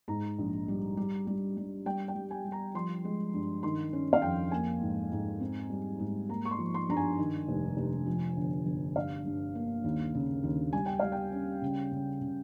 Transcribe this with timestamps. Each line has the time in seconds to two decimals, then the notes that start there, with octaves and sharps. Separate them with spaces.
0.08 G#2 A#5
0.39 A#1
0.68 G3
0.97 G3
1.27 G3
1.57 G3
1.86 G3 G5
2.08 G5
2.15 G3
2.31 G#5
2.45 G3
2.52 A#5
2.75 F3 C6
3.05 G#3
3.34 G2
3.63 D#3 C6
3.93 C#4
4.13 F5
4.22 F2 G5
4.51 A#3 G#5
4.81 G#2
5.12 G#2
5.40 C4
5.70 G3
5.99 G#2
6.29 A#3 A#5
6.45 C#6
6.51 C6
6.59 F3
6.74 C6
6.89 G2 A#5
6.97 G#5
7.19 D#3
7.48 F1
7.77 F1
8.06 F3
8.37 G1
8.66 G1
8.96 G2 F5
9.26 G2
9.55 A#3
9.84 D#2
10.15 C#3
10.44 D#2
10.73 G3 G#5
10.86 G5
11.00 G3 F5
11.12 G5
11.32 C#4
11.62 C#3
11.91 C#3
12.21 C#3